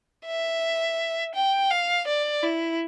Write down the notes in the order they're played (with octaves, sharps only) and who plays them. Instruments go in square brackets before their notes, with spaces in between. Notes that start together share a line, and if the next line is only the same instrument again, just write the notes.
[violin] E5
G5
F5
D5
E4